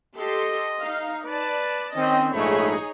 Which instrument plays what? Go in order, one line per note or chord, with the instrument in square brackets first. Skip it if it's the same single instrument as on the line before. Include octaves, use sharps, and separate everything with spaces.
[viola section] G4 A4 C6 [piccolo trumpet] D#5
[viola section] D#4 F5
[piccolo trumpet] B4 [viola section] D5 A5
[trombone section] D#3 C4 [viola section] C#4 D#5
[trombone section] A#1 G#2 A3 [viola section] D#4 G#4 C#5 [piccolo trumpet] B5